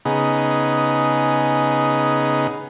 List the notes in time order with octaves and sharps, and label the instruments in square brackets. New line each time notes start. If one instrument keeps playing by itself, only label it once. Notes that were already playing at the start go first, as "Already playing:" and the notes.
[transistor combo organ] C#3 B3 D#4 G#4